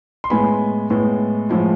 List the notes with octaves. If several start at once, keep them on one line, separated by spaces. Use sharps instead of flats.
C6
A2 G#3 B3 G#5 B5
A2 G#3 B3
A2 F3 G#3